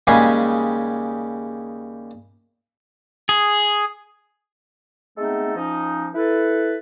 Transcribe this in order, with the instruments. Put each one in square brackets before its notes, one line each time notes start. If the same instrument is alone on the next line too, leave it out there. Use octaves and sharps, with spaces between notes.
[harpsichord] D#2 C#3 G3 G#3 G#4
[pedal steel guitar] G#4
[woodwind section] G#3 A3 B3 C4 D#4 A4
F3 C#4 D#4
E4 A4 B4